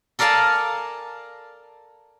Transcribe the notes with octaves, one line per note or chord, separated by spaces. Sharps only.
A4 A#4 D5 F5 G#5 A5